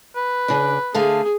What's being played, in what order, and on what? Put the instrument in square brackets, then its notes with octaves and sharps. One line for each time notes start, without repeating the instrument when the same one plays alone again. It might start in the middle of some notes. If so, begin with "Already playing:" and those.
[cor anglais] B4
[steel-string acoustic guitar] C#3 D4
[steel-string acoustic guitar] D3 A3 F5 [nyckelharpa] G#4